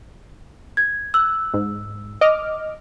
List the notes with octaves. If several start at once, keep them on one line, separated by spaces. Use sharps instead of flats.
G#6
E6 F#6
G#2
D#5 D6 F6